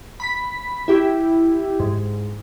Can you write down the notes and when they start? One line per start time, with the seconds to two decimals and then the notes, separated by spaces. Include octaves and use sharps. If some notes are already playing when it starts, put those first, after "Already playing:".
0.20 B5 B6
0.88 E4 G4
1.80 G#2